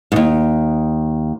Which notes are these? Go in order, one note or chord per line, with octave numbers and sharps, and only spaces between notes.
D#2 G#2